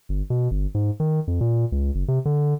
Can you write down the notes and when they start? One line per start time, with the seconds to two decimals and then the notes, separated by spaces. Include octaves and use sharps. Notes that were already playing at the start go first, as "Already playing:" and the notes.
0.09 G1
0.30 B2
0.51 G1
0.75 G#2
1.00 D#3
1.27 F2
1.41 A#2
1.72 C#2
1.95 F#1
2.08 C3
2.25 D3